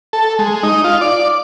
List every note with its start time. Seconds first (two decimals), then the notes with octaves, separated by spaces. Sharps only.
0.13 A4
0.39 G#3
0.63 D#4
0.84 F4
1.01 D5